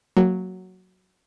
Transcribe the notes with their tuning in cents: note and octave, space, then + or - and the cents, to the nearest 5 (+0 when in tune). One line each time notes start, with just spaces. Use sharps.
F#3 +0 A#3 -15